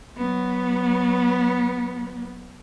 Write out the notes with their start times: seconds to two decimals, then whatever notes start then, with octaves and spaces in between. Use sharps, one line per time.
0.17 F#3 B3